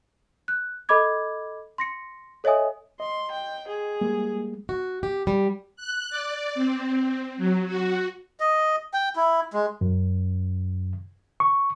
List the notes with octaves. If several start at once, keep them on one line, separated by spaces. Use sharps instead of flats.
F#6
A4 D#5 B5 D6 G#6
C6 A#6 C#7
A4 C#5 D#5 E5 G#5 D#6
D#5 C6
G5
G#4
G3 G#3 A#3
F#4
G4
G3
F#6
D5
C4
F#3
F#4
D#5
G5
E4
G#3
F#2
C#6